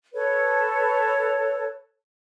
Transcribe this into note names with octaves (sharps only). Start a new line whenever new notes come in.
A4 B4 C#5